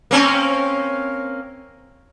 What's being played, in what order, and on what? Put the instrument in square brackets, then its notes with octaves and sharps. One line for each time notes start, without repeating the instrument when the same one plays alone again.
[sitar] A#3 C4 C#4